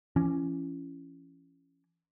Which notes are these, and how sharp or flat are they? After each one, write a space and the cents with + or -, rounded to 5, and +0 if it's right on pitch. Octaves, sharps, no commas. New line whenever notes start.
E3 +35 C#4 +0